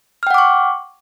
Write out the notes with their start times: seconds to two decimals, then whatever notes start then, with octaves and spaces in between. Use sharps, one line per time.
0.23 F6
0.27 G5
0.30 F#5
0.34 D6
0.38 C#6